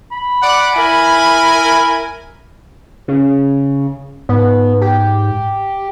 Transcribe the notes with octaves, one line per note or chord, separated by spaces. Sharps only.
B5
D5 F#5
E4 A#4 G#5
C#3
G#2 B3
G4